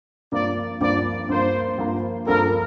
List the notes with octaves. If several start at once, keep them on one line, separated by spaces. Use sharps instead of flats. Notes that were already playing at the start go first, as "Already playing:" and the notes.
G2 F3 A#3 D5
G2 F3 A#3 D5
G2 F3 A#3 C5
G2 F3 A#3
G2 F3 A#3 D4 A4 A#4